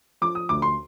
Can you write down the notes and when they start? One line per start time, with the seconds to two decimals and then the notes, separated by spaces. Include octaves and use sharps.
0.21 F3 D6
0.35 D#6
0.49 D2 D6
0.62 C6